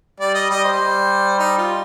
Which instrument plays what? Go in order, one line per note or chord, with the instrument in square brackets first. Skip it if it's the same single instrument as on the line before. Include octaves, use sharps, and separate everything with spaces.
[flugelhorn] G3 [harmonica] D5
[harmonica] D#5
[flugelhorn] G3 [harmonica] D#5
[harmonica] C5
[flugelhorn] G3
[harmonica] D#4
F4